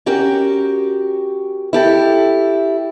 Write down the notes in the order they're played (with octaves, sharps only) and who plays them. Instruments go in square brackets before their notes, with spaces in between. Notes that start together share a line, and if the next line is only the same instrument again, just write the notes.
[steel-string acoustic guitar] C#4 F#4 G4 A#4
E4 G4 A4